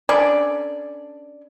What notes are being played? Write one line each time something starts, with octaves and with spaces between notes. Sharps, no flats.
C#4 D4 A4 D5